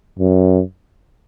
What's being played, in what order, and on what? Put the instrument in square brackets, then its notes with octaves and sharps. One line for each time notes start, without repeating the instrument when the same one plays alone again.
[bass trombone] F#2